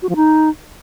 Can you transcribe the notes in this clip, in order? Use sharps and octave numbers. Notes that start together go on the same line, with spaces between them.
F#4
F3
D#4